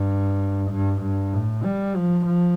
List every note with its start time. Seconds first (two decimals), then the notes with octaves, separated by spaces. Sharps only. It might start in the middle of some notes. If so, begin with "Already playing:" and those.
Already playing: G2
0.71 G2
1.01 G2
1.33 A2
1.64 G3
1.95 F3
2.26 F3